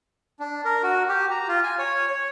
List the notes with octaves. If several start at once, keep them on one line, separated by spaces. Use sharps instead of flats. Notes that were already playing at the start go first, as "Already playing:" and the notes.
D4
A#4
F#4
G4
A#5
F4
G#5
C#5
C#5